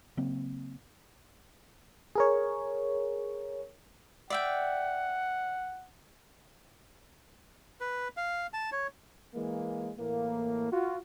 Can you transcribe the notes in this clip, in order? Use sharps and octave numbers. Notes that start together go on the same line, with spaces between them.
C#3 F#3 A#3 C4
G#4 A#4 C#5
D5 E5 F#5 G5
B4
F5
A5
C#5
E3 G#3 A#3
A2 E3 A#3
F4 F#4